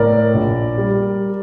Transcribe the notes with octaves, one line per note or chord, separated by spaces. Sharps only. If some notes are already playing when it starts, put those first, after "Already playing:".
Already playing: A2 A#4 D5
A#1
G3